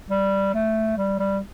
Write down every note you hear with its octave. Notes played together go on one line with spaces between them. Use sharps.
G3
A3
G3
G3